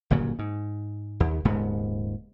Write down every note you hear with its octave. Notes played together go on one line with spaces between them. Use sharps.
G1 A#2 C#3 F#3
G#2
D#2
D#1 G#2 C#3 B3